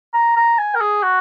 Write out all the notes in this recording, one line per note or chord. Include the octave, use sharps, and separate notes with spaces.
A#5
A#5
G#5
A#4
G#4
F#4